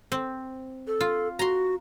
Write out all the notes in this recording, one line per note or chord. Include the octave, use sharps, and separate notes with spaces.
C4
A4
F4
F#4 A#5 C6